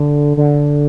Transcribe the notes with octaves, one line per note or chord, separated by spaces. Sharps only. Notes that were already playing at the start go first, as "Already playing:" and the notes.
Already playing: D3
D3